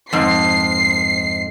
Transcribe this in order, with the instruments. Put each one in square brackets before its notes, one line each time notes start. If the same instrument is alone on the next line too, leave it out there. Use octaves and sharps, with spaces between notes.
[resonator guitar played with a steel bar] F2 G#2 [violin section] C7